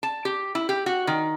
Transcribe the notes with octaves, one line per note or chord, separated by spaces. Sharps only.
A5
G4
E4
G4
F#4
D#3